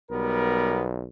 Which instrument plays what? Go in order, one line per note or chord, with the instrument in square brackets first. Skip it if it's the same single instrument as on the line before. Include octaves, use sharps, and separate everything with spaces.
[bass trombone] B1 [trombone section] G3 B3 A#4